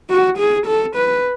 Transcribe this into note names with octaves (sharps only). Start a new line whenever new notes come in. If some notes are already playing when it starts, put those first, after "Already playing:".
F#4
G#4
A4
B4